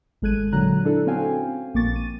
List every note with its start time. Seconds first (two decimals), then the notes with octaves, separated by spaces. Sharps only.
0.22 G#1 G#3 A4 F#6 G#6 D#7
0.52 A#2 D3 F#3 A#5 F#6
0.85 D4 E4 A4
1.07 C4 C#4 F#4 F5 G5 G#5
1.74 A#1 A#3 C#6 D6 A6
1.96 D#7